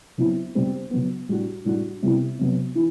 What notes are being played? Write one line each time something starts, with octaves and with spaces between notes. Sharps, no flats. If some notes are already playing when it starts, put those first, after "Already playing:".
B2 F#3 C4 E4
B2 G3 C4
B2 F#3 B3
A2 G3 D4 F#4
A2 G3 D4 F#4
C3 G3 B3 E4
C3 F#3 B3
E3